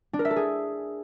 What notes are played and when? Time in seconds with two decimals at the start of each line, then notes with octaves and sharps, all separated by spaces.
0.13 D4
0.19 A#4
0.25 E5
0.31 A4
0.36 G#4